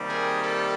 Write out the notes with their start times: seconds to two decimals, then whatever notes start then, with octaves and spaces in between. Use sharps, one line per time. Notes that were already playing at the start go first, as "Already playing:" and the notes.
Already playing: C3 D#3 G3 A#3
0.09 G#4
0.42 A4